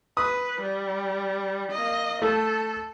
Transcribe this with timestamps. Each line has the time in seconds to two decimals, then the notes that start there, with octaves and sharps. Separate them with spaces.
0.17 B4 D#6
0.61 G3
1.72 A#3 D#5
2.22 A3 A4